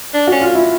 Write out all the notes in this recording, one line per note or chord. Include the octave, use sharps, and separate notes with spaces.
D4
C#4 F#4
F4
E4